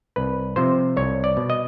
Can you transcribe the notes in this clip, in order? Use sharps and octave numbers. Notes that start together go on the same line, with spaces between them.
C2 B4
C3 F3 C5
C2 C#5
D5
B2
D#5